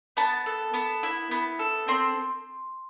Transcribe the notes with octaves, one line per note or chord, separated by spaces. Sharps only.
B3 A5
A4
B3
E4
B3
A4
C4 C6